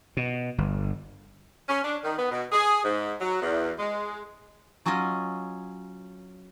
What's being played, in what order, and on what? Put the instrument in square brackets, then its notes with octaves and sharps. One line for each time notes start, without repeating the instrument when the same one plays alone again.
[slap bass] B2
G1
[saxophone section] C#4
D4
D#3
B3
B2
G#4
G#2
F#3
E2
G#3
[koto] F#3 C#4 F4 D#5 G#5